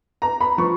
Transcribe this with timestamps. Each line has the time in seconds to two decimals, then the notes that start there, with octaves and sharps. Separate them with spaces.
0.22 A#5
0.41 B5
0.58 F3 C#6